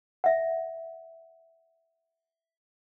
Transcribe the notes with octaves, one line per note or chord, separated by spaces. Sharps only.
E5 F#5